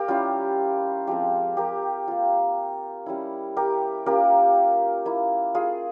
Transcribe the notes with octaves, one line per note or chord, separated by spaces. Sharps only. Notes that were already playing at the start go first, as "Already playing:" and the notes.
Already playing: A#3 G4 A#4
G3 C#4 E4 F4
F3 G#3 C4 G4
G4 A#4
A#3 F4
G3 C#4 E4
G4 A#4
A#3 C#4 F4 G4 A#4
A#3 E4
F4 G#4